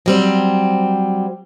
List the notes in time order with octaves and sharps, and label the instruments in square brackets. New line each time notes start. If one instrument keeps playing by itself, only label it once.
[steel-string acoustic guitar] F#3 G3 C4